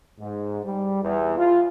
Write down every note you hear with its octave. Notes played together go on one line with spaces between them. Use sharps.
G#2
G3
E2
F4